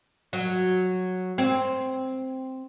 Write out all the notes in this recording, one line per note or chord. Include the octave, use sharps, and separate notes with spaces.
F#3
C4